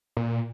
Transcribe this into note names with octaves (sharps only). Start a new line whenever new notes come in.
A#2